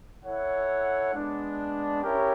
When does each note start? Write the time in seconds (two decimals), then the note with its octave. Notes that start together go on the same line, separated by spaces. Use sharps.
0.24 E4 A4 C#5 F#5
1.13 G#3 B3 D4
2.03 C#4 E4 G4 A#4 C#5